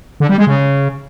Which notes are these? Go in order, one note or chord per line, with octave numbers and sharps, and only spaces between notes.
D3
G3
G#3
C#3